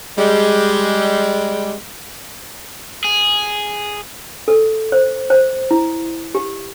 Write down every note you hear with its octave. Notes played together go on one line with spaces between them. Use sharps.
G3 G#3
G#4
A4
C5
C5
E4
G4